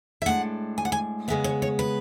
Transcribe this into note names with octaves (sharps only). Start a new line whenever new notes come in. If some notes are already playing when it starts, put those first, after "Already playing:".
E5
A2 G#3 D4 F#5
G#5
F#5
G#5
C#3 G#3 B3 E5
C#5
C#5
B4